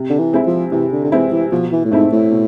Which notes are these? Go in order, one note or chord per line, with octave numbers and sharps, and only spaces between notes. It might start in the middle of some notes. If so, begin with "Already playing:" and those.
Already playing: C3
D3
E3
G#3 C4 E4
F3
C3 E3
D3
D3
E3 G#3 C4 E4
E3
B2 F3
E3
A2
G#2 A3 C4 E4
A2
B2